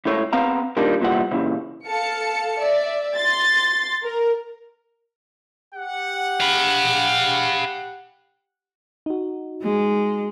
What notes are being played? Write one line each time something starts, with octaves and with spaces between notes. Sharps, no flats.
C#2 A2 A3 C#5
B3 C4 F5 A#5
A#2 D#3 G3 A#3 D4
C2 A#2 E3 G3 F#5
A#2 C#3 E3
A4 F5 A5 C#7
D5 E5
C6 A6
A#4
G4 F#5
F5 B5
D#4 F#4
G#3